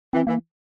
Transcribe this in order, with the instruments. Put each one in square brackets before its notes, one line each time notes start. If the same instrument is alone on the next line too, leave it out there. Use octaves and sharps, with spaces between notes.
[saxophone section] E3 [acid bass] C4
[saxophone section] E3 [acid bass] A#3